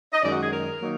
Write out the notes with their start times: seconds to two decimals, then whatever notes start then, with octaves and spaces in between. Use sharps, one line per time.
0.13 D#5
0.22 F#2 D#3 G#3 D5
0.32 F#4
0.42 G#4
0.52 A#4
0.81 D#3 F#3 A#3 D#4